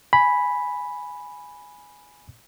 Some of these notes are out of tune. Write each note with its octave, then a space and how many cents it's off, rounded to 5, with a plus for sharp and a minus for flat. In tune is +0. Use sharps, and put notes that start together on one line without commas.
G#5 +0 B5 +0